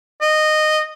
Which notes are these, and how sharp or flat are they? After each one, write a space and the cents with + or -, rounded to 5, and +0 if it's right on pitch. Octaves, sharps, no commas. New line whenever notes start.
D#5 -15